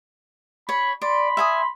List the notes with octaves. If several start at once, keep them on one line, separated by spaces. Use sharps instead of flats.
C#5 B5
D5 B5 C6
E5 G#5 D#6